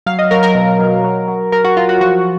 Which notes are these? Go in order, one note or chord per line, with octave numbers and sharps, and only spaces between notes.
F#3 F5
D#5
F#3 A#4
A#4
B2
F#3
F#3
F#3
F#3 A#4
F#4
F#3 F4
F#4
F3 F#4